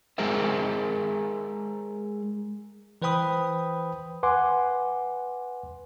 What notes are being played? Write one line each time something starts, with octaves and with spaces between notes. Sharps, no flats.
G#3 G#4 A#4 C5 E5
E3 B4 C5 G5 B5 D#6
B4 F#5 G#5 C6 D6